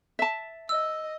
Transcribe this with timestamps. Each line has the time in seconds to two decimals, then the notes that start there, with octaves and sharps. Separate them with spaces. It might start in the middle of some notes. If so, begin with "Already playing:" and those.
0.19 E5 A5
0.69 D#5 E6